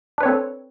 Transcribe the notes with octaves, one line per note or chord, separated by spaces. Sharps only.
C4 D4 A4 B4 C#5